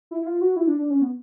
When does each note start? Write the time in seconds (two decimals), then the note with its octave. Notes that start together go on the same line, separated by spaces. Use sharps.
0.11 E4
0.22 E4
0.26 F4
0.41 F#4
0.56 E4
0.67 D4
0.79 D4
0.90 C#4
1.01 B3